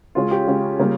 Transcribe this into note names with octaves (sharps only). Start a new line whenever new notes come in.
C#3 G#3 C#4 F4
G4
C#3 G#3 C#4
C#3 G3 A#3 C#4